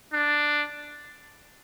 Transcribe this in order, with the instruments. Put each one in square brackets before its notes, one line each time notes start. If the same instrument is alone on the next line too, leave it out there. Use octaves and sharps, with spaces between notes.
[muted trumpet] D4